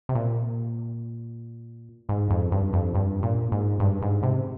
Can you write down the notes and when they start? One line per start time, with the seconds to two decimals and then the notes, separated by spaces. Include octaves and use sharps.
0.09 C3
0.15 A#2
2.09 G#2
2.30 F2
2.52 G2
2.73 F2
2.95 G2
3.23 A#2
3.52 G#2
3.80 G2
4.02 G#2
4.23 C3